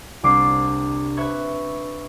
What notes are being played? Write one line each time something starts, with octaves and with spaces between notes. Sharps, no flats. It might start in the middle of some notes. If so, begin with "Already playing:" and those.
C2 D4 D6 C7
B4 E5 C#6 G#6